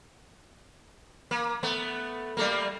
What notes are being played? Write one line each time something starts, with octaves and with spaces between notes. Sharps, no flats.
A#3
A3 B3
G3 A3 A#3